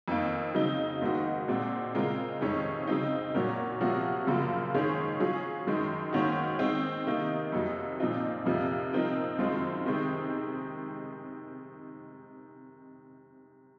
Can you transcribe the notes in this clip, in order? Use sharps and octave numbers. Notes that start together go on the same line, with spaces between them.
F2 D#3 A#3
C#3 F#3 C4 D#4
G#2 D#3 A#3 D#4 F#4
A#2 G#3 C4 F#4
C#3 G#3 C4 F4 A#4
F2 C3 D#3 G#3 C#4
C#3 F#3 C4 D#4
A#2 F#3 C#4 F#4 A#4
C3 F3 A#3 C#4 F#4
F#2 C#3 F3 A#3
G#2 D#3 G#3 C#4 G#4
F#3 C#4 F4 G#4
F#2 D#3 G#3
G#2 D#3 A#3 C#4 F#4
D#3 G#3 C4
C3 D#3 A#3 D#4
F2 C3 F#3 A#3
A#2 F3 C4 D#4
F2 C3 F3 A#3
F3 C4 D#4 A#4
F#2 D#3 G#3 C4 F4
C3 D#3 G#3 C4